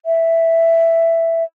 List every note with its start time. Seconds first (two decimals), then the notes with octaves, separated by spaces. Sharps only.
0.06 E5